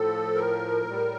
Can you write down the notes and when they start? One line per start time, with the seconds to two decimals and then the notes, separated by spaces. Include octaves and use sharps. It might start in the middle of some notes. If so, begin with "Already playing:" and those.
Already playing: A2 F3 A4
0.35 A#4
0.86 A2 G3